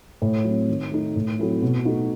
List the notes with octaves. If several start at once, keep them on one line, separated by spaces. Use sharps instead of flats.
A2
F#3 C4
D#3
A3 D#4
A2
F#3 A3 C4 E4
B2
A3 D#4 F#4